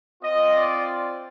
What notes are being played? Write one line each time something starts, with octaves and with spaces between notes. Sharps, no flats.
C4 F4 D#5
D5